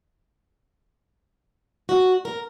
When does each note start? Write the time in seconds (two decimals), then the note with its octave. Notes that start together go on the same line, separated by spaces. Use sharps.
1.89 F#4
2.25 A#4